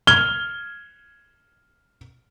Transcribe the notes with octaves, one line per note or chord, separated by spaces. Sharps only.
F6 G#6 G7